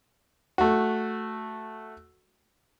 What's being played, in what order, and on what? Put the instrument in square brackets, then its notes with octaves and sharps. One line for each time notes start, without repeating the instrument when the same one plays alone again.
[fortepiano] A3 F#4